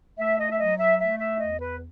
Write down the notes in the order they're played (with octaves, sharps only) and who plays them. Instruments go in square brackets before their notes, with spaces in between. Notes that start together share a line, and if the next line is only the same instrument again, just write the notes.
[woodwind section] A3 E5
D#5
E5
F#3 D#5
E5
A3 E5
E5
E2 D#5
B4